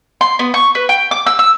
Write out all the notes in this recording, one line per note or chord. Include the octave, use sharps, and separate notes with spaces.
C6
B3
C#6
B4
G5
D6
E6
E6